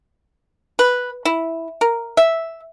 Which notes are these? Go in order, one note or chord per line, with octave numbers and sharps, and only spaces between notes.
B4
E4
A#4
E5